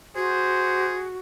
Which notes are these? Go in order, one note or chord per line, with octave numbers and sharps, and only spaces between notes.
F#4 G#4 C5